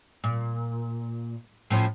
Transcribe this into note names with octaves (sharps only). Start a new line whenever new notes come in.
A#2
A2 F3 C#4